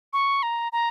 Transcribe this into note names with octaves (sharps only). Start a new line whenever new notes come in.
C#6
A#5
A#5